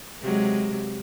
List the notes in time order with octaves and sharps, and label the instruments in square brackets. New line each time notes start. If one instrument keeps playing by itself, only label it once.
[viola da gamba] C3 F#3 G#3